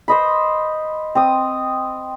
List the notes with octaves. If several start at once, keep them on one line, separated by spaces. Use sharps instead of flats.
C5 D#5 B5
C4 D#6